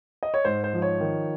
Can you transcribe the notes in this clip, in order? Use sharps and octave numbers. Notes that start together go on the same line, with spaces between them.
D#5
C#5
G#2 C5
C5
F3
C#5
D#3